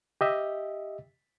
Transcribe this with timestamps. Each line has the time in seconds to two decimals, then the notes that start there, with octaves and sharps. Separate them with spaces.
0.21 G4 D#5 E5